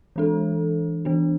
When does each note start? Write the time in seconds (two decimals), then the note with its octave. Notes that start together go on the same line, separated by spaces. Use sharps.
0.16 E3 G#3 D4 A4
1.05 E3 B3 D4